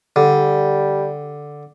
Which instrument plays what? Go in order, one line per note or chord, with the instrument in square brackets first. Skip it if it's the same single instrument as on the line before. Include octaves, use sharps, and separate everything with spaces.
[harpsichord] D3 [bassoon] G3